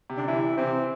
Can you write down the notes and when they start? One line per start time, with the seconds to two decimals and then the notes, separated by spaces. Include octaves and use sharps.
0.10 C3
0.17 D3 D4
0.27 C3 E3 E4
0.57 C3 E3 C4